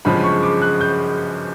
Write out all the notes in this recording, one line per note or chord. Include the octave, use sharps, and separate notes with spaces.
G1 F#2 C#3 F3 G#3 B5
C#6
D6
F#6
G6